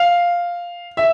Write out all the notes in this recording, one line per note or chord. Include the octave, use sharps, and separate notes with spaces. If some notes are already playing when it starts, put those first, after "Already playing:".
Already playing: F5
E5